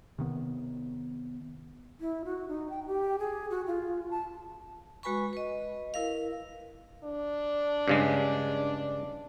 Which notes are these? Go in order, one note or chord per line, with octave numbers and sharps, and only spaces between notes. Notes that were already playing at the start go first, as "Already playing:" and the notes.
C3 D#3 B3
E4
F#4
D#4
G5
G4
G#4
F#4
F4
A5
G#3 F#4 B4 G#5 B5 C#6
B4 D#5
E4 A#4 B4 F5
D4
G2 C#3 G#3